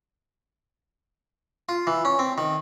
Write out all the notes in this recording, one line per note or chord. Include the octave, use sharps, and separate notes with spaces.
F4
E3
C#4
C4
D#3